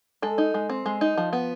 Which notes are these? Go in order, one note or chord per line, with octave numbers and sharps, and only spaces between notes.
G#3 A4
D#4
G#3
C4
G#3
D#4
F3
B3